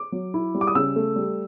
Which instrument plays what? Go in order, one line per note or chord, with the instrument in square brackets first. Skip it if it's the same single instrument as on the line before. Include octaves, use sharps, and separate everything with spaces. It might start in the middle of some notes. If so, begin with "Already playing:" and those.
Already playing: [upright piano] D6
F#3
E4
G3
D6
D#6
C#3 E6
A3
G3